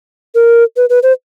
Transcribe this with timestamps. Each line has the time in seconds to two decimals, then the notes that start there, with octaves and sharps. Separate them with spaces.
0.35 A#4
0.77 B4
0.90 B4
1.03 C5